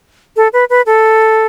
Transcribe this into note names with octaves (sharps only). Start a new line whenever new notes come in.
A4
B4
B4
A4